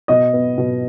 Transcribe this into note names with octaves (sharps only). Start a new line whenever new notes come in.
B2 D#5
B3
B2